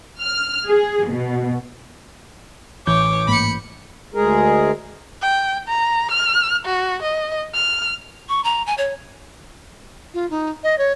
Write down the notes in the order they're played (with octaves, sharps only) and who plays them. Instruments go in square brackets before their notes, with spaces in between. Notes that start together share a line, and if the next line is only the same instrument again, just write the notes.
[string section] F6
G#4
B2
[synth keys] A1 E3 G6 [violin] C#5 [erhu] D6
[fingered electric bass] G#2 A3 A#3 [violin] B5 C#7
[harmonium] D2 G#3 G#4 A#4
[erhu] G5
A#5
F6
F#4
D#5
F6
[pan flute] C#6
A#5
G#5
C#5
[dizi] F4
D#4
D#5
C#5